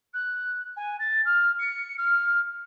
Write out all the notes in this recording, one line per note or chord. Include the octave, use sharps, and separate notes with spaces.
F#6
G#5
A6
F6
C#7
F6